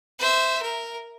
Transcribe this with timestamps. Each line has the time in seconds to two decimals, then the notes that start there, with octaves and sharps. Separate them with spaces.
0.19 C5 E5
0.62 A#4